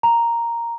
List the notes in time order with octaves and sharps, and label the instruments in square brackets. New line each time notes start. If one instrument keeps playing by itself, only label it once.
[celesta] A#5